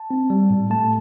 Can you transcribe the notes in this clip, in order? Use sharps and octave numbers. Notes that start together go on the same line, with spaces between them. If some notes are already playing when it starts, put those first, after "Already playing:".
Already playing: A5
C4
G3
A2
A3 A5